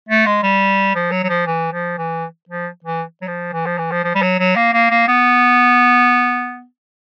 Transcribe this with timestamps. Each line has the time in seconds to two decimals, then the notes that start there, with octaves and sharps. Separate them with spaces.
0.09 A3
0.26 G#3
0.43 G3
0.95 F3
1.11 F#3
1.23 F#3
1.29 F3
1.46 E3
1.72 F3
1.98 E3
2.49 F3
2.84 E3
3.21 F#3
3.27 F3
3.53 E3
3.66 F3
3.78 E3
3.91 F3
4.04 F3
4.15 G3
4.22 F#3
4.39 F#3
4.56 A#3
4.73 A#3
4.90 A#3
5.08 B3